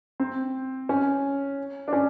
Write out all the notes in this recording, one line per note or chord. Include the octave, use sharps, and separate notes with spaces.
C4
C#4
D4
C#4